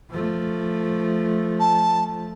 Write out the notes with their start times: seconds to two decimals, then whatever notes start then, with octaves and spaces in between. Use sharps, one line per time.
0.11 F3 A3
1.60 A5